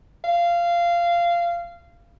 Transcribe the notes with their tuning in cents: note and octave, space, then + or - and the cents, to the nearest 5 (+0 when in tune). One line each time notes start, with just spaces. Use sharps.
F5 -15